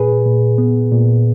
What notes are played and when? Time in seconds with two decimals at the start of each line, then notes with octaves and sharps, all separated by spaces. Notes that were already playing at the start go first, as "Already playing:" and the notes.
Already playing: A#2 G#4 B4
0.26 A#2
0.58 B3
0.92 A#2